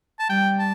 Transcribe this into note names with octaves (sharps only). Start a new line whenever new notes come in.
A5
G3 G5
A5